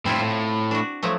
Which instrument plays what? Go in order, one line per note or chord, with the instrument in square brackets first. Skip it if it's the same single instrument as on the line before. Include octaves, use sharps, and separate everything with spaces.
[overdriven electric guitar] A2 G3 [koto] C4 E4 F4
[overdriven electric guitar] A2
[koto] D4 F#4
F3 F#3 A3